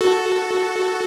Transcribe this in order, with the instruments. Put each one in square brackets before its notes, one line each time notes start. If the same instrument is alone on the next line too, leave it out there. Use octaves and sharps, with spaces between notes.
[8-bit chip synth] F#4 A4